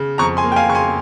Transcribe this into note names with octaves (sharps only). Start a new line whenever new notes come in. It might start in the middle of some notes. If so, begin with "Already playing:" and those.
Already playing: C#3
F2 A#5 C#6
G#5 C6
A#3
G5
F5 G#5
C#3 C#6
G#5 C6